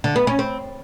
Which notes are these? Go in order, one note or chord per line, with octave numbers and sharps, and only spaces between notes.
D3
B3
C#4
C4